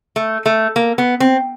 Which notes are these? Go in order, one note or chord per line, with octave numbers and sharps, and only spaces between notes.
A3
A3
A#3
B3
C4